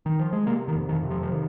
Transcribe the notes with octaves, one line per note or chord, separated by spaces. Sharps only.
D#3
F3
G#3
C3 A#3
D#3
F2
D#3
C3
F3
F3
D#3